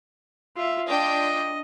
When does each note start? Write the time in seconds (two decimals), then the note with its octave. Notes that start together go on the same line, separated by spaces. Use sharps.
0.56 F4 E5
0.88 D4 F4 D#5 G5